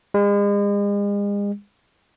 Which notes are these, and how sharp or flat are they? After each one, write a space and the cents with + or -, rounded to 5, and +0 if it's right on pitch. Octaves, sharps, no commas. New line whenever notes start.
G#3 -40